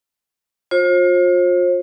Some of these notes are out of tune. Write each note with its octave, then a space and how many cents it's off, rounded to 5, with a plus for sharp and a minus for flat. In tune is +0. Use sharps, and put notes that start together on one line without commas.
F4 +35 C5 +40